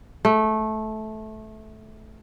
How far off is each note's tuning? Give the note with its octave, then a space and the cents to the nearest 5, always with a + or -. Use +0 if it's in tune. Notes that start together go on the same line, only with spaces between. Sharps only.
A3 -15